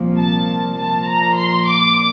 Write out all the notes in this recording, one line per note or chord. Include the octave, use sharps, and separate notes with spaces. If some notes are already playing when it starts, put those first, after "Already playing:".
Already playing: C2 A#2 F3 A#3
A5
A#2 F3 A#3 A5
A#5
C6
D6